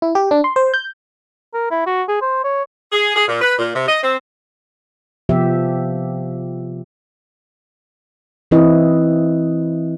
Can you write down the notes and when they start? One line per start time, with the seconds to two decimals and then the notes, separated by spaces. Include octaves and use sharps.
0.02 E4
0.15 G4
0.31 D4
0.44 C6
0.56 C5
0.74 G6
1.54 A#4
1.71 E4
1.87 F#4
2.08 G#4
2.22 C5
2.44 C#5
2.92 G#4
3.15 G#4
3.28 A#2
3.42 B4
3.59 A#2
3.75 C3
3.88 D#5
4.03 C4
5.29 C3 F3 B3 G4 E5
8.51 E3 C4 E4 B4 D#5